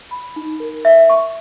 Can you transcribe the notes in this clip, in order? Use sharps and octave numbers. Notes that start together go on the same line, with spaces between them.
B5
D#4
A#4
E5
C#6